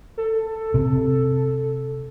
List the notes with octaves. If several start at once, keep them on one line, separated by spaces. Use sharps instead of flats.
A4
C3